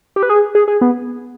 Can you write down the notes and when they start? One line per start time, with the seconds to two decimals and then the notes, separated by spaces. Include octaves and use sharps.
0.16 G4
0.23 B4
0.30 G#4
0.55 G#4
0.68 G#4
0.81 B3